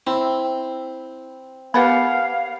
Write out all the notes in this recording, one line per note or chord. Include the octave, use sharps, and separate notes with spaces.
C4 E4
B3 G4 A#4 B4 F5 F#5 B5